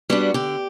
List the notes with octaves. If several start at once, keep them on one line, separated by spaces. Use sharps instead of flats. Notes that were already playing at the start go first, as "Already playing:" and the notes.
G3 B3 D4 F#4
D3 G4